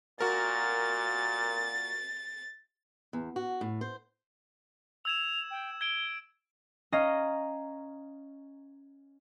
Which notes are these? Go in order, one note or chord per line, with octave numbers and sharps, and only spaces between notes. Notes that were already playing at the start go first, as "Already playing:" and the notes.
A#2 F#4 A#4 A6
E2
F#4
A2
C5
E6 G#6 E7 F7
G5
G#6 D7 G7
C#4 D#5 F5 A#5